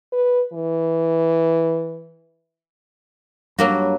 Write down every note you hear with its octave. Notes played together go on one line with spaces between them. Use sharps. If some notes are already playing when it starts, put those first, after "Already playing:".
B4
E3
G2 F#3 A#3 F#4